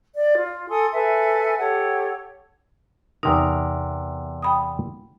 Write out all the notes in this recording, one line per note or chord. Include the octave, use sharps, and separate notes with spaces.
D5
F4
A4 G#5 C6 D#6
A4 B4 E5 G#5
G4 A4 C#5 F#5
E2 C3 D#4 A#4
G5 B5 D#6